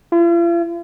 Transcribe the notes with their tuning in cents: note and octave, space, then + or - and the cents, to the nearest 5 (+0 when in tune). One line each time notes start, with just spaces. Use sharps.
F4 -45